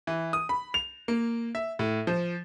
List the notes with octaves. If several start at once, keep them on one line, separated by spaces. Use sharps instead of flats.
E3
D#6
B5
F7
A#3
E5
A2
F3